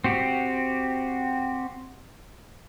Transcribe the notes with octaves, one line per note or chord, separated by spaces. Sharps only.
C4 F#4 G4